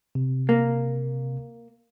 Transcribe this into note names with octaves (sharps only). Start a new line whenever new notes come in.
C3
A#3